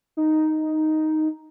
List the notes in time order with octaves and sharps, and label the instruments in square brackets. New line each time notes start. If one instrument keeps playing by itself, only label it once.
[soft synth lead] D#4